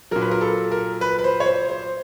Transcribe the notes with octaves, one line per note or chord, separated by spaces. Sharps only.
A#2 F#3 A#4
B4
A#4
A4
A#4
B4
B4
C5
C#5
C5
C5